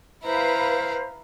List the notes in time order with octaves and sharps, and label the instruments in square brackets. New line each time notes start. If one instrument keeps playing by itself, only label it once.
[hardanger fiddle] E4 A#5 [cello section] B4 F5 [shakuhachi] C5